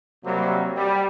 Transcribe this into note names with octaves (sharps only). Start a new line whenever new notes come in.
C3 F#3 G3 A#3 C4
G3